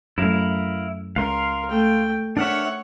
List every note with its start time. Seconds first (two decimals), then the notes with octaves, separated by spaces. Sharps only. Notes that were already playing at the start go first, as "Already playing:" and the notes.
0.18 F#2 A2 E4 A#4 F5
1.16 C#2 A#4 F5 C6
1.69 A3 G5
2.37 D4 A#4 C#5 E5 F#5